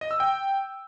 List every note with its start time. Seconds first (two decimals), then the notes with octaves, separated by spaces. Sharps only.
0.01 D#5
0.11 E6
0.20 G5